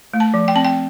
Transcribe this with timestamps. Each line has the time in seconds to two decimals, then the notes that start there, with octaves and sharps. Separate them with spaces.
0.14 A3
0.20 A5
0.34 F3
0.48 G5
0.55 C4 A5
0.64 G5